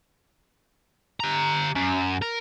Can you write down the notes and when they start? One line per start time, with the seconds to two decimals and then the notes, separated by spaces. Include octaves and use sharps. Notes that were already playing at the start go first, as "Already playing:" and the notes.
1.20 G4 A#5
1.75 F#2
2.22 A#4